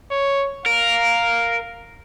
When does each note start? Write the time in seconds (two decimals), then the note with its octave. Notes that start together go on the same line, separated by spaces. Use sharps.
0.11 C#5
0.66 A#4 F5